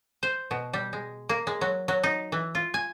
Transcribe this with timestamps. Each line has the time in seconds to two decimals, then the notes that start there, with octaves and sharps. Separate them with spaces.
0.23 C5
0.51 B2
0.73 G3
0.93 G#3
1.29 A#3
1.47 G#3
1.61 F#3
1.88 F#3
2.03 D#4
2.32 E3
2.55 F4
2.74 G#5